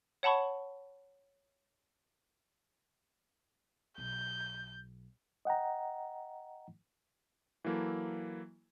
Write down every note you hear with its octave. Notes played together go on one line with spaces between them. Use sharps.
C#5 F#5 A5 B5 C#6
B1 G6
D#5 F#5 G5 A#5
E3 F#3 A#3 E4 A4